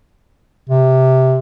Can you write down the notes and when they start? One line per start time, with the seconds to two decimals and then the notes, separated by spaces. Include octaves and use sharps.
0.70 C3